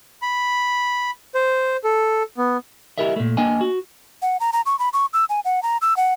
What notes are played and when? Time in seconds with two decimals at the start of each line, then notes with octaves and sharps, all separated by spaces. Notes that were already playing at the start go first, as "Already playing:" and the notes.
0.22 B5
1.35 C5
1.84 A4
2.37 B3
2.98 E4 G4 A#4 D#5 E5
3.16 A#2 A3
3.37 A#3 D4 D#5 G5 G#5
3.61 F#4
4.22 F#5
4.40 A#5
4.53 A#5
4.66 C#6
4.79 B5
4.93 C#6
5.13 E6
5.29 G#5
5.45 F#5
5.63 A#5
5.82 E6
5.97 F#5